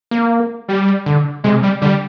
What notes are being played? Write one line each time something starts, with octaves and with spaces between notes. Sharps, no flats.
A#3
G3
D3
C3 G#3
G3
D3 G3